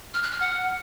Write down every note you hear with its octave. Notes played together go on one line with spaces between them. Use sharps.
F6
F#6
F6
F#5